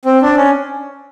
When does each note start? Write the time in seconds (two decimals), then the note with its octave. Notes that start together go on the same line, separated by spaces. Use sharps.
0.05 C4
0.22 D4
0.36 C#4